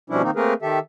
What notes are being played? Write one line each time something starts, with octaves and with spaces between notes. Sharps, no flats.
B2 F3 G3 C#4 D4 E4
D#3 A#3 C4 D#4
A3 A#3 C4 G#4 A#4 B4
D#3 G4 A4 E5